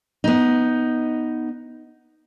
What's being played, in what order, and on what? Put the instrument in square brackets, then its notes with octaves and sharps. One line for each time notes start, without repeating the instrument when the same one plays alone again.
[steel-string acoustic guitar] B3 D#4